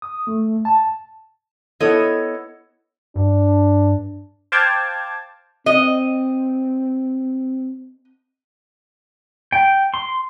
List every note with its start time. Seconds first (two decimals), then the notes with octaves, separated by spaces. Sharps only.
0.02 D#6
0.27 A3
0.65 A5
1.80 B3 E4 A4 C#5 D#5
3.16 G2 D4
4.52 C5 F5 G5 A5 D6 G#6
5.66 C4 D#5
9.52 G5
9.94 C6